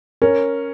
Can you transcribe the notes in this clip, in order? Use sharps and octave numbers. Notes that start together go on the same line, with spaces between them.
C#4 A#4